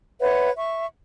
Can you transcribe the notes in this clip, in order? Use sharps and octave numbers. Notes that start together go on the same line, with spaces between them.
B4 C#5 E5 F#5
E5 C#6